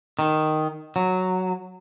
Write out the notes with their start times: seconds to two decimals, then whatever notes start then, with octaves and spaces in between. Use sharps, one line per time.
0.19 D#3
0.96 F#3